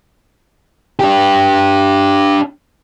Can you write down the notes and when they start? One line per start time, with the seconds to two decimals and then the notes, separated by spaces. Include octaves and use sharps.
0.99 D4 G4